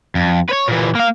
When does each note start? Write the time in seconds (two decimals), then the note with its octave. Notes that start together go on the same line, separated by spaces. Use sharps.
0.15 F2
0.49 B4 C#5
0.68 A#2 E3
0.95 A#3 F5